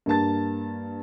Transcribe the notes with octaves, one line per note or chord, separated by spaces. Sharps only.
G2 A#3 A5 A6